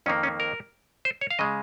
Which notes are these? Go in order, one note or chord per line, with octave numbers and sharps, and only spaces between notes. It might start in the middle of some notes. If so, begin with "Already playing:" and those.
F2 D#3 A#3 C#4
C#4
A#4
C5
C#5
F5
C#3 G#3 D#5